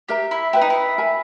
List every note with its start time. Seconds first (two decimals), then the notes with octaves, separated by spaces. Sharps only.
0.09 G4 A#4 E5 A#5
0.31 E4
0.53 E4 B4 E5 G5
0.61 D#4
0.70 E4
0.98 A#4 E5 G#5 B5